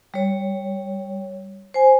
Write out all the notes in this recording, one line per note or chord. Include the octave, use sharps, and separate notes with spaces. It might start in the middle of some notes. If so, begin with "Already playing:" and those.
G3 C#5
C5 G#5